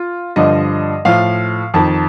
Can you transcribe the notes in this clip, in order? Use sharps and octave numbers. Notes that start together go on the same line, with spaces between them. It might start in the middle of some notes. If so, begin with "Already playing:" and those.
Already playing: F4
G2 D3 F3 D#5
A2 F3 F5
F2 D#3 A5